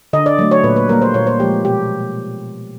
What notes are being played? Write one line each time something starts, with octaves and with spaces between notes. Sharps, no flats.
D3 D#5
D5
F#3 A3
C#5
A#2 B4
B4
G3 A#3 A#4
C5
A#2 C#5
C5
F3 G#3 G4
B2 G4